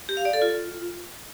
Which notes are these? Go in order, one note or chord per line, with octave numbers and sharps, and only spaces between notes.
G4
F5
D5
A4
F4